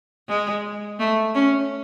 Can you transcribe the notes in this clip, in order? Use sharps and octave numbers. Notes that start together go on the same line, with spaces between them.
G#3
A3
C#4